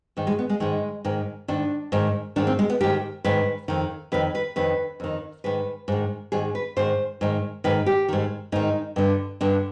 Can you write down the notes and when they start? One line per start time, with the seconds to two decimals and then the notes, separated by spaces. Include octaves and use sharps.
0.17 G#2 D#3
0.27 G#3
0.39 B3
0.49 G#3
0.60 G#2 D#3 G#3
1.05 G#2 D#3
1.48 G#2 D#3 D4
1.92 G#2 D#3
2.36 G#2 D#3 D4
2.47 C4
2.59 G#3
2.70 B3
2.81 G#2 D#3 G4
3.24 G#2 D#3 B4
3.68 F2 D#3
4.12 F2 D#3 B4
4.35 B4
4.56 F2 D#3 B4
5.00 F2 D#3
5.44 G#2 D#3 B4
5.88 G#2 D#3
6.32 G#2 D#3 G#4
6.55 B4
6.76 G#2 D#3 C5
7.21 G#2 D#3
7.64 G#2 D#3 B4
7.86 G4
8.08 G#2 D#3
8.52 G#2 D#3 D#4
8.96 G2 D3
9.41 G2 D3 D4